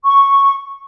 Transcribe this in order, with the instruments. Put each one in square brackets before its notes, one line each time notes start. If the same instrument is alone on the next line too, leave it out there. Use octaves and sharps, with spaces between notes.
[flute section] C#6